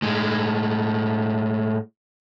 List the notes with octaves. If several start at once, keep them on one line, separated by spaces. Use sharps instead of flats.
A2 G#3